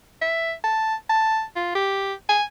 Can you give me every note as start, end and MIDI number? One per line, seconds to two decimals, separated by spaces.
0.21 0.53 76
0.64 0.95 81
1.09 1.43 81
1.56 1.70 65
1.75 2.14 67
2.29 2.43 80